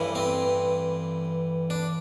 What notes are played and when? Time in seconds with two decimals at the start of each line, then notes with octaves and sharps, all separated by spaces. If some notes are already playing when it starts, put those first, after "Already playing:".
Already playing: A1 G2 E3
0.15 C4
1.70 D4